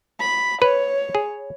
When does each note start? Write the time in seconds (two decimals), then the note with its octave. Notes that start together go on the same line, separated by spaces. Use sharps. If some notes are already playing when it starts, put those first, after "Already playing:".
0.20 B5
0.62 B4 C#5
1.15 G#4